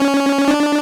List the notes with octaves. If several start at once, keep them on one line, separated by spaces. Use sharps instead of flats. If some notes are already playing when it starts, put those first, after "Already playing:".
Already playing: C#4
D4